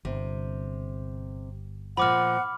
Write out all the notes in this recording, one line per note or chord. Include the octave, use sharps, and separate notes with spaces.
G1 C3
A#2 F3 F#5 B5 D6 F6